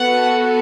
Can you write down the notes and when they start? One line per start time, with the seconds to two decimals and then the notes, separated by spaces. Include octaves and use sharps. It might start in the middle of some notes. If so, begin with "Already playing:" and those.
Already playing: B3 F#4 A4 F#5